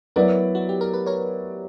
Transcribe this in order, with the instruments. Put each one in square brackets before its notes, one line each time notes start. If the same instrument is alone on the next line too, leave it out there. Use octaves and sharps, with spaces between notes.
[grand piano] F#3 B3 E4 B4 D5 [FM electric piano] F#4 A#4
[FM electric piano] F#4
G4
A#4
B4
A#4 C#5